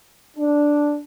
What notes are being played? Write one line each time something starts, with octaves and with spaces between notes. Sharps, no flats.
D4